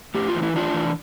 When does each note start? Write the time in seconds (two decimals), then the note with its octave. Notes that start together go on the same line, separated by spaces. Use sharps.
0.15 A2 G4
0.28 F4
0.34 E3
0.43 E4
0.55 A2 D4 F4
0.74 E3